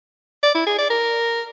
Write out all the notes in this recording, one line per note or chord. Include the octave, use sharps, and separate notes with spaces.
D5
E4
G#4
D5
A#4